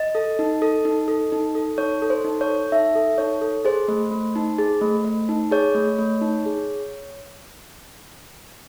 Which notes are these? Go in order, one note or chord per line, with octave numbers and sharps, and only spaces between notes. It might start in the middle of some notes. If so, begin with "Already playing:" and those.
Already playing: D#5
A4
D#4
A4
D#4
A4
D#4
A4
D#4 C#5
A4
C5
D#4
C#5
A4
D#4 E5
A4
D#4 C#5
A4
G#4 C5
A3
A3
D#4
G#4
A3
A3
D#4
G#4 C#5
A3
A3
D#4
G#4